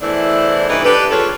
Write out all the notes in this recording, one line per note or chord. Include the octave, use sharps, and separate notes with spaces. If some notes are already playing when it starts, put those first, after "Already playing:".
E2 E3 A3 D4 E4 C5
G2 E3 D#4 E4 G4 B4
D4 G4 A4 B4
G#3 D4 F4 A4 B4 C#5